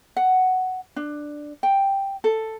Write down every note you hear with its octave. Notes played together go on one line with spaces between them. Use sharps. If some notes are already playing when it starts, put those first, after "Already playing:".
F#5
D4
G5
A4